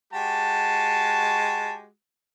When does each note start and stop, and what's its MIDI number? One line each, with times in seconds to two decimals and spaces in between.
0.13 1.87 56
0.13 1.87 66
0.13 1.87 67
0.13 1.77 81